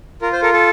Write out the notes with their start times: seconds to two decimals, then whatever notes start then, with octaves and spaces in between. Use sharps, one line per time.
0.22 F4 A#4
0.33 C5
0.42 A4 A#4
0.53 A4